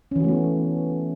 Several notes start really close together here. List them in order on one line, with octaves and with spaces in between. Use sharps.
C#4 E3 F#4 A3 B3